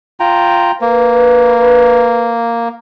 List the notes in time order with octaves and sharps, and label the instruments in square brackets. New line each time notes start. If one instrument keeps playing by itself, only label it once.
[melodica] F4 G5 A#5
[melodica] A#3 [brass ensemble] B4